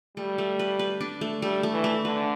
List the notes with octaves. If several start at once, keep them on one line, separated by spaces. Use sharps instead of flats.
G3 A3
A3
B4
B4
D4
A3
G3 A3
A3
E3
A3
D3 B4